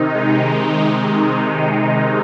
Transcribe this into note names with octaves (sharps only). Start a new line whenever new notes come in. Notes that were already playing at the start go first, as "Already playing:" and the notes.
Already playing: C3 D#3 D#4
G#3